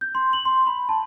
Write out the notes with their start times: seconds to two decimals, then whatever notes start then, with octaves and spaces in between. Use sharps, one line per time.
0.01 G6
0.15 C6
0.33 F#7
0.45 C6
0.67 B5
0.89 A5